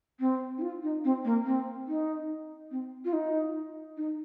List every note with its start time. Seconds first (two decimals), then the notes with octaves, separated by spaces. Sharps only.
0.20 C4
0.58 D#4
0.62 F4
0.83 D#4
1.04 C4
1.25 A#3
1.46 C4
1.88 D#4
2.71 C4
3.05 F4
3.13 D#4
3.97 D#4